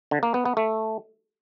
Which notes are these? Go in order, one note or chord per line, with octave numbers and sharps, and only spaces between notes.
D3
A#3
B3
B3
A3